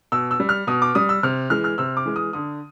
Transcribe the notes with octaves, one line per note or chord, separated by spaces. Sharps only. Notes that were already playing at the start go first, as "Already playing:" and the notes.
B2 E6
E6
G3
F6
B2 D#6
D6
G3 D#6
E6
C3 F6
E3 G#3 F6
F6
C3 E6
D6
E3 G#3
D#6
D3 D#6